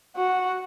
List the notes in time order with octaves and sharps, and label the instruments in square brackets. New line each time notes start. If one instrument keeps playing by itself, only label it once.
[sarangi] F#4